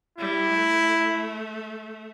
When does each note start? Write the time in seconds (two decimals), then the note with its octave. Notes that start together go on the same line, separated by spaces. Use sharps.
0.18 G3 E4
0.49 A3